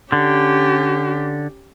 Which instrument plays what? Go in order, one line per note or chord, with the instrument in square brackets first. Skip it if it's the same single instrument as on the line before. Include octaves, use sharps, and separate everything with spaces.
[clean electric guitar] D3 [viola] C#4 G4